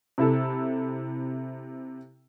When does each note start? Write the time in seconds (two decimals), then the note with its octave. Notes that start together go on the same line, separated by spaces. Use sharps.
0.18 C3 E4 A4